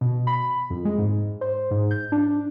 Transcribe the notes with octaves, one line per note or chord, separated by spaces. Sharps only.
B2
B5
F2
G#3
G#2
C5
G#2
G6
D4